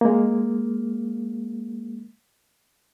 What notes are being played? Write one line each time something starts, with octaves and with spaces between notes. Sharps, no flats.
G#3 A#3